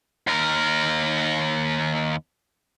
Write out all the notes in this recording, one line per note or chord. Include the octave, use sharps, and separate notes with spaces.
D#2 A#4